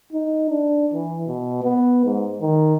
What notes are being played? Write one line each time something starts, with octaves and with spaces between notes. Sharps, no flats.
D#4
D4
E3
B2
B3
G#2
D#3